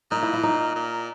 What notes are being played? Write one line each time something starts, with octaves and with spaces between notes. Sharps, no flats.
A#2 D#4
E4
E4
D#4
A#2